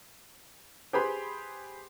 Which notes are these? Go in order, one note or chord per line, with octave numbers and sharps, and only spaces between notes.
G4 G#4 B4 C5 B5 C6